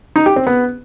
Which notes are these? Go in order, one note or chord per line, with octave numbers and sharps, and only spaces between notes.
D#4
G4
C4
B3